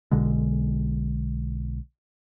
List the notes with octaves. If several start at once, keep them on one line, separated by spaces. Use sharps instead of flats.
B1 B2 D3 G#3